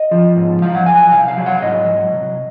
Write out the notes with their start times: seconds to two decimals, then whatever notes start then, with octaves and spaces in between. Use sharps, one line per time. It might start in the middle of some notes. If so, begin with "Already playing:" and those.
Already playing: D#5
0.11 F3
0.36 G#2
0.62 F#3 F5
0.75 F#5
0.86 F#3 G#5
1.00 G#5
1.11 C2 F5
1.28 F5
1.37 F#3
1.46 F#5
1.62 G#2 D#5
1.88 F#3
2.12 C3